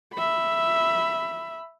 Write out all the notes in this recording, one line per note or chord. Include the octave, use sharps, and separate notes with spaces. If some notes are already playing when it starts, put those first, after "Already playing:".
E5 B5